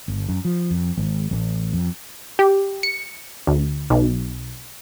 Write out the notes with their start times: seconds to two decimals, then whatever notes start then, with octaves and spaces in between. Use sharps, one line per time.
0.08 G1
0.29 F#2
0.45 F3
0.71 F2
0.97 G#1
1.31 A1
1.73 F2
2.39 G4
2.83 C#7
3.47 D2
3.90 B1